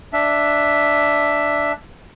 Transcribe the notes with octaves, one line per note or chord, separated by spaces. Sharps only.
D4 E5